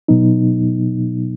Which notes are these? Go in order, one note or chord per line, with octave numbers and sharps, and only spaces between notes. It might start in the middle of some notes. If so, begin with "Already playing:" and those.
B2 F#3 B3 D#4